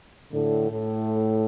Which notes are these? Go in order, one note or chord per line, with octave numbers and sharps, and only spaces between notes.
A2 D3
A2